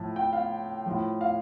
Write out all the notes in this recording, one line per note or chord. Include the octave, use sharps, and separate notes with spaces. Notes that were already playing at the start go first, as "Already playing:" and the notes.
Already playing: A2 F3 A5
G5
F5
A2 F3
F5